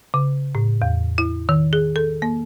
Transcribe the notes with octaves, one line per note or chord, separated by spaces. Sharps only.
C#3
A2
E2
E4
D#3
G#4
A4
A#3